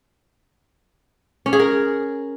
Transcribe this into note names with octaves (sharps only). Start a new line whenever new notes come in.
C#4
G#4
A#4